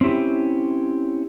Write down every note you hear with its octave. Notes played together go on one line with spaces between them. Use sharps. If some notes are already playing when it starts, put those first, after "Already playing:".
C4 C#4 E4 G4